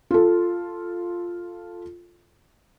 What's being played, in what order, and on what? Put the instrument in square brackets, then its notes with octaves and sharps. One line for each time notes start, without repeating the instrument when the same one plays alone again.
[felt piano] F4 A4